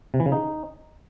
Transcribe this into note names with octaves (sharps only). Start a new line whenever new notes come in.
C3
E3
C#3
D#4